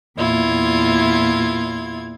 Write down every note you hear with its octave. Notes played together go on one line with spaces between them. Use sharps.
E2 A#2 E4 F4 G#6